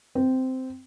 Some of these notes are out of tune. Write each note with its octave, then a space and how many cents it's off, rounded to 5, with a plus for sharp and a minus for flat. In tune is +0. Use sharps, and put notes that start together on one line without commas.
C4 -10